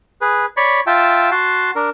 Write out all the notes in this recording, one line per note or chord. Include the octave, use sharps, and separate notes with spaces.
G#4 B4
C#5 D5 B5 C#6
F4 E5 G5 A5
F#4 A5 C6
D4 A#4